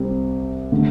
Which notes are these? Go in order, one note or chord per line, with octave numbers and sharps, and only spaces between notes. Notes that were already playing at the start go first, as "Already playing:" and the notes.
Already playing: C2 C3 G3 C4
D3 A3